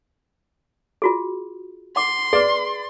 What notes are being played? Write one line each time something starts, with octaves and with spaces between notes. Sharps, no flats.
F4 F#4 G#4
F#5 C6 D6
G#4 B4 D5